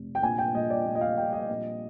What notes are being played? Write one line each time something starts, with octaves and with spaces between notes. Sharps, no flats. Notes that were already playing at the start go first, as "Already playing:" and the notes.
Already playing: F1
G5
A#1 G#5
G5
A#2 D#5
D5
A#2
D#5
F5
G3 G5
D#5
A#1